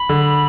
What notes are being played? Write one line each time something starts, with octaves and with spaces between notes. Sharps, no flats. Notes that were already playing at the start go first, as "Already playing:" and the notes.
Already playing: B5
D3